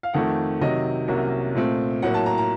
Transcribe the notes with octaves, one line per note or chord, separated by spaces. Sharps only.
F5
F2 D#3 A3 F#5
C3 D#3 F#3 D#5
C2 C3 F#3 A#3 C#4
A#2 A3 C4
A2 F#3 A#3 F#5
A5
A#5
A#5